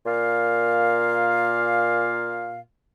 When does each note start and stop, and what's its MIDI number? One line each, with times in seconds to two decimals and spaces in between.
0.06 2.60 46
0.06 2.60 77